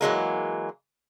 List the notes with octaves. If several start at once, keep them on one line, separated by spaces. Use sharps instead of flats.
E3 F#3 G#3 A#3